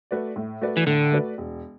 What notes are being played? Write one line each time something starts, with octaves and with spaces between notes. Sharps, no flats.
A3 F#4 B4 D5
A2
A3 F#4 B4 D5
E3
A2 D3
A3 F#4 B4 D5
E1